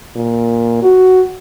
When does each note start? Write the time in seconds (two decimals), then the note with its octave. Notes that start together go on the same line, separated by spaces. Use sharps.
0.16 A#2
0.82 F#4